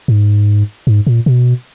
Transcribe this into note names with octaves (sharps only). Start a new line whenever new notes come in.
G#2
G#2
A#2
B2